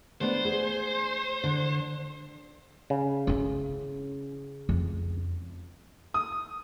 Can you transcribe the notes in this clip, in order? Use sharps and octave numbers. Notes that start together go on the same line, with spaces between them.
A3 B3 D4 C5
G#4
D3
C#3
C#4 E4
F2
D#6